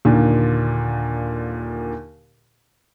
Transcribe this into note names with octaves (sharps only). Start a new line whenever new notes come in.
D#2 A#2 D3